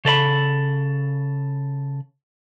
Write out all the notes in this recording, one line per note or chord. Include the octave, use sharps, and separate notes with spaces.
C#3 A4 D5 B5